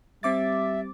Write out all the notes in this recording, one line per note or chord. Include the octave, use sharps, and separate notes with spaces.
G3 C4 E5 D6 A6